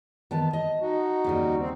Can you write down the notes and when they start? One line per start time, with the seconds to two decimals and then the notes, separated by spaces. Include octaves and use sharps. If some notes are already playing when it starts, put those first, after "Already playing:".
0.31 D#3 B3 A5
0.53 D#5
0.81 D#4 F#4
1.24 D#2 C#3 G3
1.58 C4